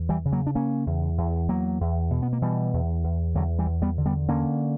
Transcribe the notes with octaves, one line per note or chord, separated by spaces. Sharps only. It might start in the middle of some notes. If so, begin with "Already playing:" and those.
Already playing: E2
E3 G3
C#3
F#3 A#3
D4
C#3 A#3 C#4
E2
E2
E2 F#3 A#3
E2
B2
B3
A#3
B2 E3 G3
E2
E2
E2 D3 F#3
E3 G3
E2
G3 B3
D3
G3 B3
D3 A#3 C#4